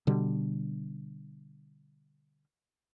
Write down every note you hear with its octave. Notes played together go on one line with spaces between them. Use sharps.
B2 D3 G3